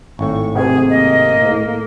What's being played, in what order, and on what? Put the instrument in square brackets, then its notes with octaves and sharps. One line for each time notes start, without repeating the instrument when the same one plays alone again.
[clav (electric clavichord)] G#1 A2 [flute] C#6
[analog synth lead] C3 [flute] G#4
[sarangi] A#3 [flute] D#5
[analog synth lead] A2